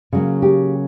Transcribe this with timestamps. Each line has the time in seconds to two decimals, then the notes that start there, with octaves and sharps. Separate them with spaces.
0.13 C#3 F#3 A#3
0.42 G4